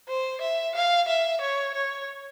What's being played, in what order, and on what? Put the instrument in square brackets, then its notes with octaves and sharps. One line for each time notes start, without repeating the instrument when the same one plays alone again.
[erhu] C5
E5
F5
E5
C#5
C#5